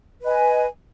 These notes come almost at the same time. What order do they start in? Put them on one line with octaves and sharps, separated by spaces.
B4 D#5 G#5